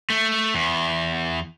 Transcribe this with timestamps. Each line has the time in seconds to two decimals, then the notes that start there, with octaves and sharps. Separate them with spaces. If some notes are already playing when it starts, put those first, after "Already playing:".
0.10 A3
0.55 E2